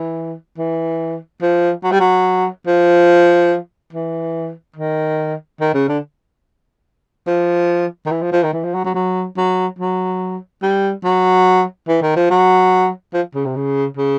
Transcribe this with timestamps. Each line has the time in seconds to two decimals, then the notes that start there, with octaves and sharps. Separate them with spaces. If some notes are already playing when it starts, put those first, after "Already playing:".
Already playing: E3
0.58 E3
1.42 F3
1.84 F#3
1.92 G3
2.00 F#3
2.67 F3
3.93 E3
4.76 D#3
5.61 D#3
5.74 C#3
5.88 D3
7.27 F3
8.06 D#3
8.11 E3
8.22 F3
8.33 F3
8.43 D#3
8.53 E3
8.64 F3
8.74 F#3
8.85 F#3
8.95 F#3
9.37 F#3
9.79 F#3
10.63 G3
11.04 F#3
11.88 E3
12.02 D#3
12.16 F3
12.30 F#3
13.14 F3
13.35 C#3
13.45 C3
13.56 C#3
13.97 C#3